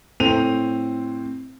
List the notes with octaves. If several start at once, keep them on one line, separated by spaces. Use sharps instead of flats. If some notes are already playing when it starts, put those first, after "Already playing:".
A2 C4 C5 D#7 F7